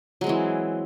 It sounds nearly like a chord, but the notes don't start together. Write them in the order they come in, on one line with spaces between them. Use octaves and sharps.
F#3 G#3 C4 E3